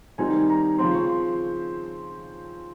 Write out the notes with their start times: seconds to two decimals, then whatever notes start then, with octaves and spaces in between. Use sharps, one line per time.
0.18 D#3 G3 C4 D#4 G#5
0.49 A#5
0.78 C#3 F3 C4 C6
0.94 C#6
1.09 C6